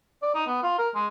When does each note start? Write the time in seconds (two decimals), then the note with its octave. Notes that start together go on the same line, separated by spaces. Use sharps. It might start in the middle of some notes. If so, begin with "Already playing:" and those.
0.22 D5
0.34 D#4
0.47 B3
0.63 F4
0.78 A#4
0.95 G#3